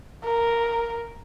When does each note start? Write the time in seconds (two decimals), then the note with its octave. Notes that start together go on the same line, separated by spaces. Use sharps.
0.24 A#4